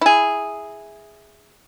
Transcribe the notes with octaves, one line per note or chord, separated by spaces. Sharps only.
E4 G#4